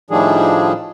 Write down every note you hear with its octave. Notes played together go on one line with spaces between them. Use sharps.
A2 D#3 F3 G3 D4 G#4